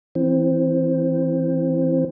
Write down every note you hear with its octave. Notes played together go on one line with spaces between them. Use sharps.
E3 C4